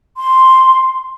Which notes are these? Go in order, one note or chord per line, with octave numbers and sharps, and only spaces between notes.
C6